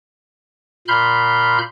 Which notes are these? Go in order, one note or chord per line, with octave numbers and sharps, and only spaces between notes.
A#2 B5 C6 F6 G6